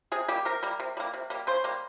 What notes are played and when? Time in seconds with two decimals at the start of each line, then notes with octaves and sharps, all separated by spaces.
0.12 C3 G#4
0.28 G3 A#3 G4
0.45 C3 A#4
0.63 G3 A#3
0.80 C3
0.97 G3 A#3
1.14 C3
1.30 G3 A#3
1.47 C#3 C5
1.64 G3 A#3